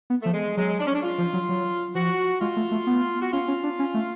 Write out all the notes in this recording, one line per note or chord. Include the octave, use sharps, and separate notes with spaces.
B3
F3 A3
G#3
F#3 G#3
D4
C#4
D4
F4
F3
F#3
F#3
F3 F#4
G#3 F4
A3
A3
B3
F#4
C#4 F4
C#4
D4
C#4
A3